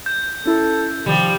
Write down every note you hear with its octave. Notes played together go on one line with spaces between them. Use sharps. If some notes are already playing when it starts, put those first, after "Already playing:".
G6
C#4 E4 A4 A#4
C3 D#3 F3 G3